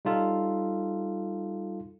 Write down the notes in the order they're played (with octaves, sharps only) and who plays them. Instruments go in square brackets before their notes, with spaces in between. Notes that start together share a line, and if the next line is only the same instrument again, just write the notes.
[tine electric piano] G3 D#4 F4 A4